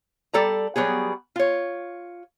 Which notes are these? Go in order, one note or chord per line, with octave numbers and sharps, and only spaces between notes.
G3 A4 D5 A#5
F#3 G3 B3 G#4
F4 C#5